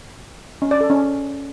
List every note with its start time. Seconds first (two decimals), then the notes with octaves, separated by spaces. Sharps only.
0.62 C#4
0.71 D5
0.81 A4
0.90 C#4